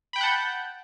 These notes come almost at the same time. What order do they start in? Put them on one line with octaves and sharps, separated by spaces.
B5 G5 G6 F#5 A5